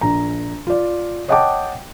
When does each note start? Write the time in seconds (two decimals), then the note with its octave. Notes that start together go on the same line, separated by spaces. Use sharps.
0.01 A#1 A#5
0.67 F4 D5
1.28 C#5 D#5 F#5 G5 A5 D6